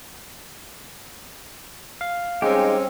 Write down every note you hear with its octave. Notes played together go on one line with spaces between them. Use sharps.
F5
G3 G#3 C4 C#4 D#4 G4